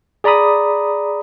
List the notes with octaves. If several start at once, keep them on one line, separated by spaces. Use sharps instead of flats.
G#4 D5 A#5 B5 D#6